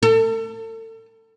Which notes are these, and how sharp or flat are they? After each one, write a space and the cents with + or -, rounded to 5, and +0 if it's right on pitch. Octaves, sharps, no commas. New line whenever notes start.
A4 +35